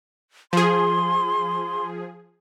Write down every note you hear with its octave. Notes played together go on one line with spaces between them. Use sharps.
F3 G#4 C6